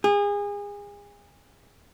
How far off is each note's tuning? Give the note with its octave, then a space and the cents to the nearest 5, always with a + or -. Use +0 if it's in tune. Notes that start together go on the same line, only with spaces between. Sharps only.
G#4 -30